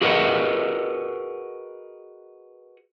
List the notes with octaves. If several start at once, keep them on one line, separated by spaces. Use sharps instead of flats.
F#4 G#4 A#4 B4 D#5 F#5